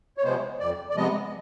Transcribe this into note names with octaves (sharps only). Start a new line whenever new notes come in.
C#5
C3 F3 G#3 B3 C5
F2 D5
D5
C3 F3 G#3 B3 D#5